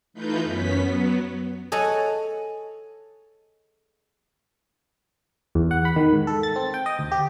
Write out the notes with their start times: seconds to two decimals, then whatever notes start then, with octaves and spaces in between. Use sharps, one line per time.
0.14 E3 A3 D#4 F4 B4 G6
0.43 F#2 B3 C#4 B6
0.81 F#3 B3
1.72 G#4 A4 C#5 D#5 F#5
5.55 E2
5.71 F#5
5.85 B5
5.96 D#3
6.13 G#2
6.27 A4
6.43 A6
6.56 C4
6.74 G5
6.86 D#5
6.99 D2
7.12 G4